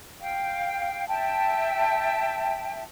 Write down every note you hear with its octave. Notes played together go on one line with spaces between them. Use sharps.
F5 G5
E5 G5 A5